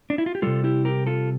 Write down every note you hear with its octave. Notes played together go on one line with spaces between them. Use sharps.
D4
E4
F4
G4
C3 G3 F4 A4
E4 G4
G4 A#4
F4 A4